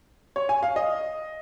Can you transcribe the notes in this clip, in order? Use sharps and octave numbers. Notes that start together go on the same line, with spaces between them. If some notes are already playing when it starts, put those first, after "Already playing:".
C#5
G#5
F5
D#5